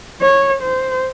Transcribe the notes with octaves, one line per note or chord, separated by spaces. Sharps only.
C#5
C5